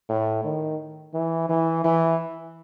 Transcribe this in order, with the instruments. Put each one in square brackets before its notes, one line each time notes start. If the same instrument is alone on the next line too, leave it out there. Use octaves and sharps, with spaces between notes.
[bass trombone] A2
D#3
E3
E3
E3